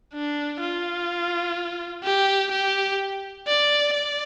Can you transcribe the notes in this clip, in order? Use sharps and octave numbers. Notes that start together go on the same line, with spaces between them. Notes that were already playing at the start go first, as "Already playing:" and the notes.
D4
F4
G4
G4
D5
D5